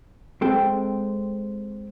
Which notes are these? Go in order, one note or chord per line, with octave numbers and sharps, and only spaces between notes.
G#3 C4 A4 G5